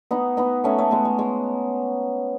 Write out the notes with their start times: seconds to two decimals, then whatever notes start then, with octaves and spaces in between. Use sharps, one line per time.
0.11 B3 D#4
0.37 B3 D#4
0.64 A3 C#4
0.78 A3 C#4
0.91 G#3 B3
1.05 G#3
1.18 G#3